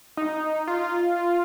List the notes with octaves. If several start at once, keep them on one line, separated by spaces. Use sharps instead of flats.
D#4
F4